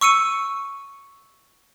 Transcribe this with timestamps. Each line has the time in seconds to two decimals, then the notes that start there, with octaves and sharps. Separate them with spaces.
0.01 C#6 E6 C#7 D#7